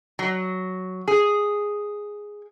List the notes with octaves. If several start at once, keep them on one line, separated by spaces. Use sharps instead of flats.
F#3
G#4